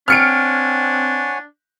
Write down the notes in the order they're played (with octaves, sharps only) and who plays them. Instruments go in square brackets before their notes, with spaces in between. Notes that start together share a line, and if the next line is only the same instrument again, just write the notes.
[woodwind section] C4 [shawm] D4 [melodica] C#5 F#5 G#5 [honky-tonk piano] F6 C#7 D7